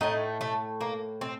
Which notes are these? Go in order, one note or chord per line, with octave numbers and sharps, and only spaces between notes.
A2 A3 D#4
A3
A#3
C4